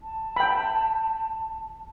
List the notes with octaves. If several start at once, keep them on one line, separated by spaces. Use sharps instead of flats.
A5
G5 B5